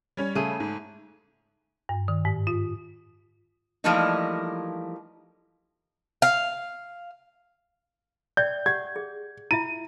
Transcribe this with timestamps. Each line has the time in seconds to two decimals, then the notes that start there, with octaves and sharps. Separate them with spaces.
0.17 G3 C#4 C#5
0.35 C#3 A3 G#4 D#7
0.60 G#2
1.89 G2
2.08 D#3
2.25 G#2
2.47 F4
3.84 E3 F3 G3 A3 A#3 D#4
6.22 F5
8.37 D5 E5 G5 G6
8.66 G4 F#5 G#6
8.96 G#4
9.51 E4 F4 E5 D#7